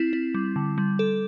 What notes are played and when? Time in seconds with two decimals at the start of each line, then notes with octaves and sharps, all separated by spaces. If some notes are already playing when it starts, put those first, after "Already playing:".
Already playing: C4 E4
0.13 E4
0.34 G3
0.56 D3
0.78 G3
0.99 A4